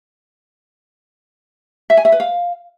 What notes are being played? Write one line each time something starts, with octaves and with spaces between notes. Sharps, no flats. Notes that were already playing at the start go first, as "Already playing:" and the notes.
E5
G#5
E5
B4
F5